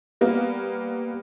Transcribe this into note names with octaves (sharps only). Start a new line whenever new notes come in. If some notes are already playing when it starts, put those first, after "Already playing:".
G3 A#3 B3